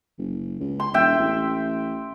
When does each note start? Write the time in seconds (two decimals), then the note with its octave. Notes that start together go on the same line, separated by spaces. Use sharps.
0.18 F#1
0.60 C#2
0.80 C6
0.94 E1 E5 G5
1.18 A1